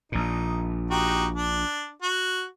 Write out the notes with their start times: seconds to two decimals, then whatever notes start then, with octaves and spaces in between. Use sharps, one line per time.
0.12 A#1 A#2 D#4
0.91 D#4 F#4 G4
1.35 D4
2.03 F#4